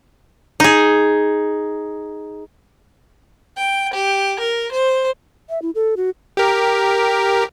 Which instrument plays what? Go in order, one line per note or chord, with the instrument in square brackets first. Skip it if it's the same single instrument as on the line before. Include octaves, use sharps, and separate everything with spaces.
[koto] D#4 G#4
[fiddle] G5
G4
A#4
C5
[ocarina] E5
E4
A4
F#4
[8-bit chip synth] G4 A#4